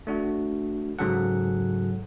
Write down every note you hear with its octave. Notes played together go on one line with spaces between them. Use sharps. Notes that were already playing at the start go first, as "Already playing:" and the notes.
A3 D4 F#4
G#2 C#3 F#3 G#4 A4 F#5